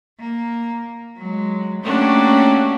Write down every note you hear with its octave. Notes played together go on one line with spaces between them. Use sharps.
A#3
F#3 G#3
A3 A#3 C#4 D4 F#4 G4